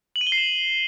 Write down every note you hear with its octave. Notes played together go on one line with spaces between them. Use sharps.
F#7
D#7
G7
C7
E7